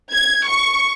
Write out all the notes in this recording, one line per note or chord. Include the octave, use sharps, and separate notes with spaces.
G#6
C#6